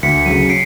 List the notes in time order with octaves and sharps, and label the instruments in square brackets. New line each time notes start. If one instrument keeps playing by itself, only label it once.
[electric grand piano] D2 [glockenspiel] B6 C#7
[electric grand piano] C#3 F#3 [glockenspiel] C#7 D#7
[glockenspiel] C7 D7